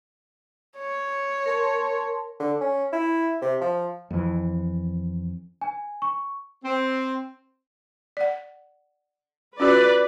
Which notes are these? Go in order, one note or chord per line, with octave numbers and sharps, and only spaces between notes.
C#5
A#4 A5 C6
D3
C#4
E4
C3
F3
F2 E3
G#5
C#6
C4
D5 F#5
C#4 F4 F#4 B4 D5